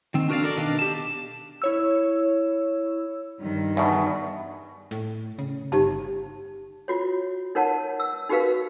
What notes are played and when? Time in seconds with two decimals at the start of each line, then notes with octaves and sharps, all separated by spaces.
0.14 D#3 C4
0.29 D4 F#4 A#4 C5 D5 F5
0.43 A4 A#4 D5
0.57 B2 D#3 D4 D#5 F5
0.79 G4 A5
1.62 E4 C#5 E6
3.40 G2 D#3
3.77 E2 B2
4.91 A2
5.39 C#3
5.72 G1 D#4 G4 A5
6.88 F4 F#4 C#5
7.55 D#4 A#4 C#5 F#5 A5
8.00 E6
8.29 D#4 F#4 G4 A#4 B4 F5